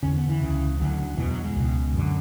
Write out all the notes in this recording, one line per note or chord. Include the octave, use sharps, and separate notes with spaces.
E2 D3 C#4
B3
E3
C#2 C#3
D2 D3 F#3
E2 B2 E3
F#3
G#3
C#2 B2
F#2 D3